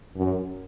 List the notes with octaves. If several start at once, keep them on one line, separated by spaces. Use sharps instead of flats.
F#2